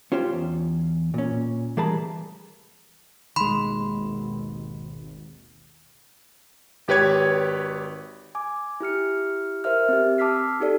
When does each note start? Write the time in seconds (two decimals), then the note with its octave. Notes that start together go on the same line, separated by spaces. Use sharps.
0.12 C#4 F4 G4 C5
0.33 E2
1.14 A#2 C#4
1.77 E3 G3 G#4 A#4 A5 B5
3.36 G#1 D#2 B2 D#3 G#3 B5 C6
6.88 G#1 G4 B4 C#5 G#6
8.35 G#5 D6
8.80 E4 G4 F6 C#7
9.64 A#4 C5 E5 F6
9.89 C4 G4
10.18 A5 D6 E6 F6 B6 C7
10.60 D#4 G4 A4 D5